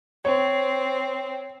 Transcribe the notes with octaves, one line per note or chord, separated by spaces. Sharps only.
C4 C#5